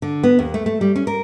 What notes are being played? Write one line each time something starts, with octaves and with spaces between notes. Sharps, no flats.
D3
B3
D#2
A3
A3
G3
C#4
A#4